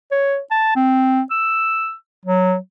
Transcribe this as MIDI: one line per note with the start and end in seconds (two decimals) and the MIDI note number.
0.11 0.39 73
0.51 0.74 81
0.76 1.21 60
1.31 1.94 88
2.26 2.56 54